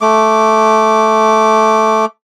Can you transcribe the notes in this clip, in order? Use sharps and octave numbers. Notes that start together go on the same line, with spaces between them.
A3 D6